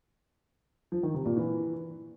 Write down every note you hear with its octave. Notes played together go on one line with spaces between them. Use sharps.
F3
D#3
C3
A#2
E3